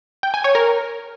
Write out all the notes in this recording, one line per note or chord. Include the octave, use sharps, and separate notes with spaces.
G5
G#5
C#5
A#4